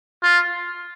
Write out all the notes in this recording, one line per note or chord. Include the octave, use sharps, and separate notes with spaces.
F4